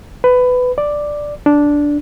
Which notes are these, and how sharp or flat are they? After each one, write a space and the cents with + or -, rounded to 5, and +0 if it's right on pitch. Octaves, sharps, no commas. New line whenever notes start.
B4 +15
D5 +5
D4 -5